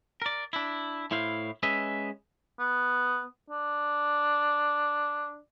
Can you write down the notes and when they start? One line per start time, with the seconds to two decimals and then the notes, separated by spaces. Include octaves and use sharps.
0.22 A#4 D5
0.53 D4 E4
1.11 A2 E4 C5 F5
1.63 G#3 C#4 B4 D#5 E5
2.59 B3
3.50 D4